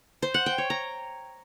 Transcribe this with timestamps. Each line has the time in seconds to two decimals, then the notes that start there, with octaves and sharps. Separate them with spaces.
0.22 C5
0.34 F#5
0.46 G5
0.58 C#5
0.70 A#5